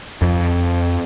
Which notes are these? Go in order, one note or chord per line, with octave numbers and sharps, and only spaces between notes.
F2